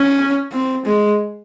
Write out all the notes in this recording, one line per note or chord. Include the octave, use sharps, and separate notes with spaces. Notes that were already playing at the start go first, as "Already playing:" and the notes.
Already playing: C#4
C4
G#3